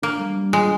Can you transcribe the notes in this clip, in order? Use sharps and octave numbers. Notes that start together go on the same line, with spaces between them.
A#3 D4
G3
G3
G#3 F4